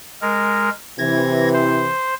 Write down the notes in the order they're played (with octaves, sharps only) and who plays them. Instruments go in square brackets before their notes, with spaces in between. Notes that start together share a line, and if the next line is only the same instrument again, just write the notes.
[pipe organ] G#3 A#4
[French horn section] C3 E3 [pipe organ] G#6 A#6
[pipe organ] C5